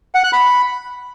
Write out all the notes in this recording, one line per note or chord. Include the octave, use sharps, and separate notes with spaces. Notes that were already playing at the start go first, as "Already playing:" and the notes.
F#5
F#6
B5